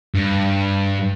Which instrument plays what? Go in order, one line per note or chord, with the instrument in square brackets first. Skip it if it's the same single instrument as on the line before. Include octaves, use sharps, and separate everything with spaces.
[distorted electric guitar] G2